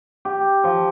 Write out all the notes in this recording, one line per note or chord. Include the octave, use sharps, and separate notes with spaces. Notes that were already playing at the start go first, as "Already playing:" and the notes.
G4
F3